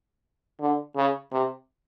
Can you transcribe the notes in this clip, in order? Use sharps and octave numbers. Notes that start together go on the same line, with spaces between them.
D3
C#3
C3